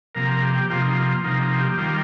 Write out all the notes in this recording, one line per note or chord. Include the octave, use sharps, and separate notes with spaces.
C3 F3 A#3 A#4
G4
C3 F3 A#3 F4
D#4
F4
C3 F3 A#3 D#4
D#4
G4
D#3 G3 A#3 F4